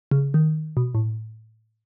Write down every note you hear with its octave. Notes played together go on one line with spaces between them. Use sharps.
C#3
D#3
B2
A2